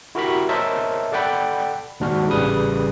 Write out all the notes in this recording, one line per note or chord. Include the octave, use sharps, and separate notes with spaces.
E4 F#4 G4 A#4 A#5 B5
A#4 C5 C#5 D#5 E5 A5
A4 D5 F#5 G5 B5
D#2 G#2 D4 F#4 F6
A1 C#3 G3 B4 D#6